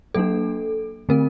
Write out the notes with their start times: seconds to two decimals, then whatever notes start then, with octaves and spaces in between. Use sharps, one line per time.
0.14 F#3 A#3 D4 A4
1.09 D3 A3 C4 A#4